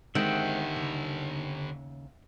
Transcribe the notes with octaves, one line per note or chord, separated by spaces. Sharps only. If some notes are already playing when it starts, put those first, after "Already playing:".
D3 D#3 G#3 C4 G4 E5 F#5 G5
D#2 C#3